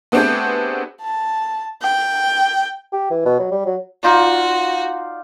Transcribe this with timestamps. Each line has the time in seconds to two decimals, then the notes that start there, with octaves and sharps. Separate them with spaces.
0.12 A3 B3 C4 D4 G4 G#4
1.01 A5
1.82 G5
2.92 G4
3.10 E3
3.25 B2
3.39 F#3
3.51 G3
3.66 F#3
4.03 D#4 F4 F#4 D5